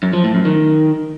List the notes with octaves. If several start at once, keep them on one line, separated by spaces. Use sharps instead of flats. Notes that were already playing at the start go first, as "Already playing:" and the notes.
F#2
F3
A2
F#2
D#3